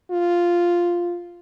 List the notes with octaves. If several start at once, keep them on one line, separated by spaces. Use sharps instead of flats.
F4